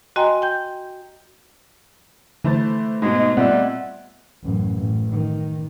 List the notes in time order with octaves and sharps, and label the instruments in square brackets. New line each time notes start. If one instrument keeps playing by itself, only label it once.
[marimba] F#4 D#5 G5 G#5 A#5 C6
G5 G6
[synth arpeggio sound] D3 [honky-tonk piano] E3 C5 A6 [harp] A3
[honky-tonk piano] G#2 B2 [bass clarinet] G#3
[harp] D#5
[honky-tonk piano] A#2 B3 [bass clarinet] G3 [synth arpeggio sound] C4 [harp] E5 F#5
[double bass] A1 F#2
A1
D#3